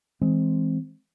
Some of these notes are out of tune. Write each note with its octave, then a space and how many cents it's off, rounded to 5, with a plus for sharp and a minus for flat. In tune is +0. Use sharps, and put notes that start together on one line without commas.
E3 -10 G#3 +5 C4 +0